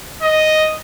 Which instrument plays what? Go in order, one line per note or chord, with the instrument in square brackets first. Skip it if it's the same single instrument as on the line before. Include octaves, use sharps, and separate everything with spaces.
[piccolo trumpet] D#5